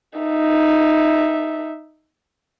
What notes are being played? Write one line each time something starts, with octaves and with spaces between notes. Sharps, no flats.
D#4 E5